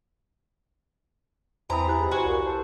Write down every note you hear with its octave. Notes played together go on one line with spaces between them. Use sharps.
E2 E3 C4 G#5 A#5 B5 D#6
E4 G4 F#6
G#2
F#4 B4 C5 G#5
C2 A#2
A4 C5